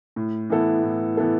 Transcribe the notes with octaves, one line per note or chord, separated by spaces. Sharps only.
A2
E3 B3 E4 A4
A2
E3 B3 E4 A4